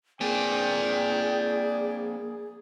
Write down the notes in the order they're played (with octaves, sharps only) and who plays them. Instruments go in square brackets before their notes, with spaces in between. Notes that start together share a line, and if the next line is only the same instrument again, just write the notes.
[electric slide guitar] A#3 C4 D4 [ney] G#4 [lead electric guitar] D5 G#5 [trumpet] G5